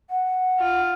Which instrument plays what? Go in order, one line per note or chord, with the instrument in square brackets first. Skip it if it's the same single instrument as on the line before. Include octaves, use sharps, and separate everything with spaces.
[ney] F#5
[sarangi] F4